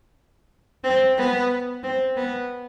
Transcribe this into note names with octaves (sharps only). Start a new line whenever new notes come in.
C4
B3
C4
B3